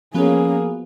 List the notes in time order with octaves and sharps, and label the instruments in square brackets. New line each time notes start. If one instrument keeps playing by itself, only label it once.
[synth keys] F3 B3 F#4 [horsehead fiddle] A#3 G#4 [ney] C#4